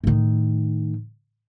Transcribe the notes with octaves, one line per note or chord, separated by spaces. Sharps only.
A2 D#3